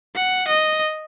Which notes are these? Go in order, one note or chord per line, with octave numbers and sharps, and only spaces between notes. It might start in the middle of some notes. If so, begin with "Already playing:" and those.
F#5
D#5